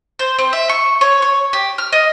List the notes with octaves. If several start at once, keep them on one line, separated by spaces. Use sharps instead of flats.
C5
C4
E5
C#6
C#5
C#5
G4
F6
D#5